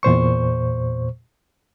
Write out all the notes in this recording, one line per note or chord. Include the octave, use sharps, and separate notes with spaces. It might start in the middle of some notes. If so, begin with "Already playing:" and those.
E2 A#2 C5 C#6